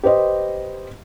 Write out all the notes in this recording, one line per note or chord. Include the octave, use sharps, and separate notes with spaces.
G4 B4 C5 D#5